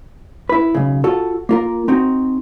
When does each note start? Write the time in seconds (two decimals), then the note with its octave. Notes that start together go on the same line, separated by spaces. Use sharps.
0.49 E4 B4
0.75 B1 C#3
1.04 F4 F#4 A4
1.49 A#3 F4 A#4
1.88 C4 D#4 F#4